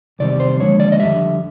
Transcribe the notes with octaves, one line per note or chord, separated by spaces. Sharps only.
E2 C3 D#3 G3 C4 D5
C5
D#2 D3 F3 G#3 C#5
D5
D#5
F2 D3 G3 E5